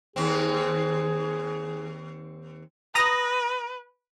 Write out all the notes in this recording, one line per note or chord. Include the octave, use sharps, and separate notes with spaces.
D#2 C4 G#4
B4 A#5 D#6 A#6